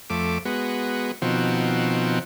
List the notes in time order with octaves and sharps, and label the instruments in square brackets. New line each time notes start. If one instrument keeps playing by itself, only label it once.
[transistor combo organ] F2 A3 D6
G#3 B3 F#4
B2 D#3 F3 C4 F#4